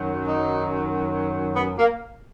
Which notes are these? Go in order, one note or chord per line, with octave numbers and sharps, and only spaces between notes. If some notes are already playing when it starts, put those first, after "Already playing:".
Already playing: F#2 D#3 F#3
D#4
B3
A#3